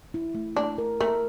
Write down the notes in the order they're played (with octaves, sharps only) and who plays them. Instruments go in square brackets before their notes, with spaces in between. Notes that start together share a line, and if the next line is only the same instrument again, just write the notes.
[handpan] E4
A3
[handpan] A3 [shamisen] D4
[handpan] A#4
[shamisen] A3 [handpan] A#4